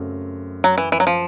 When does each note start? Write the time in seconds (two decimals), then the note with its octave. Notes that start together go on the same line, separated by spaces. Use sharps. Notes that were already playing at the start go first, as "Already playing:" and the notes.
Already playing: F#2 C#3 F#3 A3 C4
0.64 F#3
0.78 E3
0.92 E3
1.00 F#3
1.07 F3